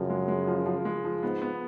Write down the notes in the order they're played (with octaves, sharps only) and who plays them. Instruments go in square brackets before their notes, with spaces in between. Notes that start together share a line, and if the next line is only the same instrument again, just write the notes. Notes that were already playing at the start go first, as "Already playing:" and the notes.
Already playing: [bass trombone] F#2 [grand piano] C#3 F3
[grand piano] G#3
G#3
F3
F3
G#3
F3
[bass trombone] G#2 [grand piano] B3
[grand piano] B3